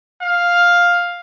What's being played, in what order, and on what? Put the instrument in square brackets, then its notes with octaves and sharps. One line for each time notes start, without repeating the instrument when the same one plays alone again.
[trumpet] F5